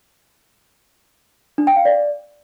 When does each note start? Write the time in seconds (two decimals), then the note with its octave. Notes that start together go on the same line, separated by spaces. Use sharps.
1.58 D4
1.67 G5
1.76 F5
1.85 D5